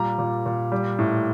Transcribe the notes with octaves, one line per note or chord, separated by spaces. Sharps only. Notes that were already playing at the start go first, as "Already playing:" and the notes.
Already playing: A#2 G3 A#5
A#2
A#2
G3
A2